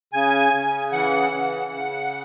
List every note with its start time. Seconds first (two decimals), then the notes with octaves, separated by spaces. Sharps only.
0.13 C#3 G#5
0.53 C#3
0.92 E3 F#5
1.32 C#3
1.71 C#3